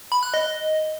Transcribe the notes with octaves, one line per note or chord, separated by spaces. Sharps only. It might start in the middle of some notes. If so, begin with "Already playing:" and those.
B5
F#6
D#5